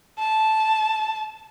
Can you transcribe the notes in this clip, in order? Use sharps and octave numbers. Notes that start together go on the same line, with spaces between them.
A5